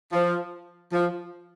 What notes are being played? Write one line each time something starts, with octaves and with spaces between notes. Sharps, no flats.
F3
F3